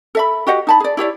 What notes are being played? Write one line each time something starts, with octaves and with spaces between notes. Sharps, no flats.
A4 E5 B5
F#4 G4 D#5 F#5
D#4 A5 B5
G#4 D5
E4 G4 C#5 D5